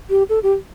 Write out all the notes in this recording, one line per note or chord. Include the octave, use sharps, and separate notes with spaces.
G4
A4
G4